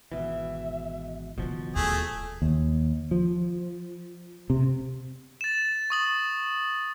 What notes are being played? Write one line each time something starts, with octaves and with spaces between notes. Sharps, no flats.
G#1 B2 E3 E5
B2 D3 D#3 F3
D#1 D#2 A3 G#4 A4
D#2
F3
C3
A6 E7
C#6 D#6 F#7